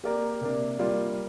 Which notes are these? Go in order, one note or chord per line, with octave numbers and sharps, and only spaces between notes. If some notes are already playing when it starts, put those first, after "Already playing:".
A#3 G4 A#4 D5
C3 A#3 D4
G3 A#3 F4 D5